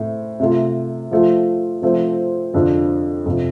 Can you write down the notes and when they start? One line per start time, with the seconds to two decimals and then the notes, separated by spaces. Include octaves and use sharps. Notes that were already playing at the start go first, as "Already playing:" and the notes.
Already playing: A2 A3 C4
0.40 C3 A3 F4
1.11 F3 A3 F4
1.82 F3 A3 C4
2.54 F2 D3 F3 D4 F4
3.26 F2 C3 F3